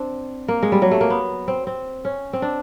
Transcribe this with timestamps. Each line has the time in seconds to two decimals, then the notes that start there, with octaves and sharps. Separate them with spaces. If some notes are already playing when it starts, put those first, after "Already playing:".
Already playing: C4 D4
0.48 A#3
0.63 G#3
0.72 G3
0.82 F#3
0.91 A3
1.01 A#3
1.10 B3
1.48 C4
1.67 C4
2.05 C#4
2.33 C4
2.42 D4